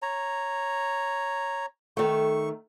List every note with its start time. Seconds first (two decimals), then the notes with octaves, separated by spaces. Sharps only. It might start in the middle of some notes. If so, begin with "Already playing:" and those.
0.02 C#5 A#5
1.97 D#3 A3 C#6